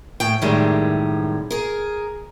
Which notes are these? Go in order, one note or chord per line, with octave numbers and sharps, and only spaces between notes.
A2 G5
F#2 A2 C3 D#3 G3 G#3
G#4 A#4